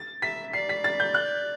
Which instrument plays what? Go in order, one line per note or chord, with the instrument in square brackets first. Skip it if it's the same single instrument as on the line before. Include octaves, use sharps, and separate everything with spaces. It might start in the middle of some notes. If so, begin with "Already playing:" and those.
Already playing: [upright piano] A6
[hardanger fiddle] E5 [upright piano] B6
[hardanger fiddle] D5 [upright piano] C7
[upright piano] B6
A6
G6
F#6